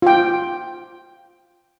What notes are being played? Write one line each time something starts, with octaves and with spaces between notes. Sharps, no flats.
F4 G5